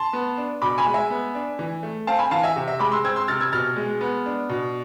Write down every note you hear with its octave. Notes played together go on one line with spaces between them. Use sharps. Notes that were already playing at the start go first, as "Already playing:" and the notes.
Already playing: A5 C6
B3
D4
B2 B5 D6
G#5 B5
G#3
E5 G#5
B3
D4
E3
A3
C4 F5 A5
G#5 B5
E3 F5 A5
E5 G#5
C3
E5
G#3 B5 D6
C6 E6
C4 E6 G#6
C6 E6
C3 F6 A6
E6 G#6
B2 F6 A6
G#3
B3
D4
B2